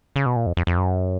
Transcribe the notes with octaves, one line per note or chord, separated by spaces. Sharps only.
C#3
B2
A#2
F2
F2
F2
F#2